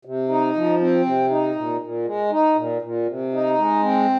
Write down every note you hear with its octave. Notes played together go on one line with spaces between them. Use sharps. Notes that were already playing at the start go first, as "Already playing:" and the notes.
C3
D#4
F3
C4
C3
D#4
A#2
A#2
G#3
D#4
A#2
A#2
C3
D#4
G#3
C4